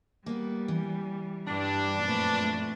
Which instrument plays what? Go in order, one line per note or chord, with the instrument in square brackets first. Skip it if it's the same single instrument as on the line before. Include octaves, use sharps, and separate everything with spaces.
[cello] G3 [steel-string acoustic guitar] A#3 B3
[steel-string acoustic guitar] E3
[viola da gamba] G2 [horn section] D4
[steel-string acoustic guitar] F#2 [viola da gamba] A#2 C4 B4 [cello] F3 A3